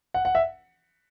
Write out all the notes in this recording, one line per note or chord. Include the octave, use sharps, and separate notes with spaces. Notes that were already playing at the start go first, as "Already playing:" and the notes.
F#5
F#5
E5